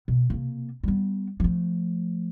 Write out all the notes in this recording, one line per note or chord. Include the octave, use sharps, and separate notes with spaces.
B2
C3 A#3
G3 B3
F3 A3